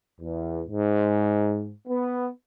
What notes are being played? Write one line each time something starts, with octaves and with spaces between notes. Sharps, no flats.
E2
G#2
B3